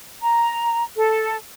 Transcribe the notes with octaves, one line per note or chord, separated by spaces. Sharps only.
A#5
A4